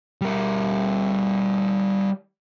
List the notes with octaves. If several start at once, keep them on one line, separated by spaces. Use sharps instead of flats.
G3 A#4